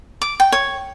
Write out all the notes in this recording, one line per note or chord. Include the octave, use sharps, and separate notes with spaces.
D6
G5
C#5